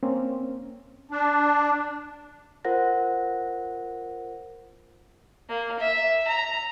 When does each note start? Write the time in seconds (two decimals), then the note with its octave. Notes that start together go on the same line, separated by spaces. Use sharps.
0.03 A#3 C4 C#4
1.11 D4
2.65 F4 A#4 C5 F#5 A#6
5.49 A#3
5.80 E5
6.28 A#5